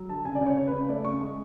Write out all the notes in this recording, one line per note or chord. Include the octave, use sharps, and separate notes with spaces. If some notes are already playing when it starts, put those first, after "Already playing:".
Already playing: F#3
D3 A5
C#3 G#5
D5
C#3
C#5
C#3 C#5
B4
C#3
A3 D5
C#3 C#6
G#3